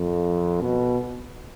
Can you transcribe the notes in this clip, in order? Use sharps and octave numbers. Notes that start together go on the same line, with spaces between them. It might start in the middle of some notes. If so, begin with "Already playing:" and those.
Already playing: F2
B2